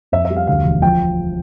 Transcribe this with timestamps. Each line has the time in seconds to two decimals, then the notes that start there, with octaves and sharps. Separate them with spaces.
0.12 F2 E5
0.25 E5
0.30 G3
0.36 F5
0.47 D2 F5
0.64 E1
0.82 F3 G5